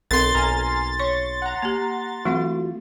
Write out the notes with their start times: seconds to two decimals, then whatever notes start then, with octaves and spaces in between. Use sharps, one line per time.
0.11 B1 C4 A4 A#4 C6 A6
0.35 B1 G#5 A#5 F6
1.00 C#5 C#6
1.42 F#5 A#5
1.62 A#3 G4
2.25 E3 F#3 A3 C4 F4 F#4